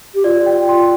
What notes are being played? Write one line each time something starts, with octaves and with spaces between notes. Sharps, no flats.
G4
F4 D5
G5
C6